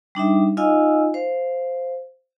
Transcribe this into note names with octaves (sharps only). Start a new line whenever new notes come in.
G3 D4 D#4 E5
D#4 F4 D#5 F5 G#5 E6
C5 F5